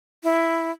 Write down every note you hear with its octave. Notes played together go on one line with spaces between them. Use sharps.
E4